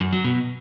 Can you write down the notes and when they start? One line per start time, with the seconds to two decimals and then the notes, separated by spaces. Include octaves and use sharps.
0.01 F#2
0.13 F#3
0.24 B2